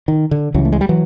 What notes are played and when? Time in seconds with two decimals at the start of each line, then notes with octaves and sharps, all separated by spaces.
0.08 D#3
0.31 D3
0.54 C#2 C#3 E3 F#3
0.65 A3
0.73 G#3
0.81 G3
0.89 E3 F#3